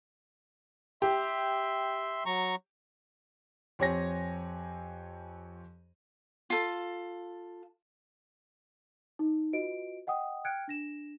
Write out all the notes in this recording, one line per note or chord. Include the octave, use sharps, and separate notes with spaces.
G4 E5 C6
F#3 A#5 C#6
F2 C4 G4 C#5 G#5 A#6
F4 A4
D#4
F4 F#4 B4 D#5 D7
D#5 F#5 G5 D#6
G5 F6 F#6 G#6 C#7 D7
D4 A#6 E7